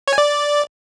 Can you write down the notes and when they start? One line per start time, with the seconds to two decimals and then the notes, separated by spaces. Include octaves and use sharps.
0.08 C#5
0.13 G#5
0.18 D5